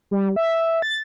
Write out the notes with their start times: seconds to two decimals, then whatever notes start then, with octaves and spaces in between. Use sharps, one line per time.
0.11 G3
0.36 E5
0.82 A6